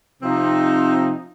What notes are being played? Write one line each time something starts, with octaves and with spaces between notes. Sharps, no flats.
C3 F3 C4 D#4